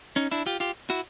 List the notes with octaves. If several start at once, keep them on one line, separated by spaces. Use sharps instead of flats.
C#4 D#4
D4 E4
F4 G4
F4 G4
E4 F#4